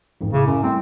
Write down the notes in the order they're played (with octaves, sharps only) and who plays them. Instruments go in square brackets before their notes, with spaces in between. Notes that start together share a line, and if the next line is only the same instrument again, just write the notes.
[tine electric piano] A1 F2 G#2
[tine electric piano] A2 E4 D6 [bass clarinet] C#3
[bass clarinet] F#2
[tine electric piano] G3 A3 E4 [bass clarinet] C4